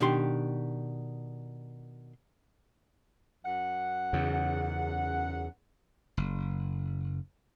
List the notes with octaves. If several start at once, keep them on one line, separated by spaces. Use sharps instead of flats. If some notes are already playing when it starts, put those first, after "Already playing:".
B2 D#3 D4 G4 C6
F#2 F#5
E2 C#3
F#1